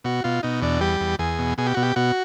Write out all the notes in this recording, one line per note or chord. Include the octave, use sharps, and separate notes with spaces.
B2 F#4
B2 F4
B2 D#4
E2 D4
G3 G4
E2
E2 G#4
B2
B2 G#4
G4
B2 F#4
G4
B2 F#4